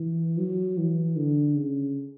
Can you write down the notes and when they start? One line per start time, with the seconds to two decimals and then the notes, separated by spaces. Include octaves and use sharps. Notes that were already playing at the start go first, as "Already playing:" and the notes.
Already playing: E3
0.38 F#3
0.78 E3
1.16 D3
1.55 C#3